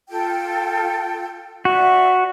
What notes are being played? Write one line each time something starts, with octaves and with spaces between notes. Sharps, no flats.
F4 A4 G5
F#4 D5 E5